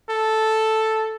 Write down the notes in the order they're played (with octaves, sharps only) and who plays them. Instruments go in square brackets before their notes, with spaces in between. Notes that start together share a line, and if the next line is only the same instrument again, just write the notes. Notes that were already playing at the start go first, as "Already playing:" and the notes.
[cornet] A4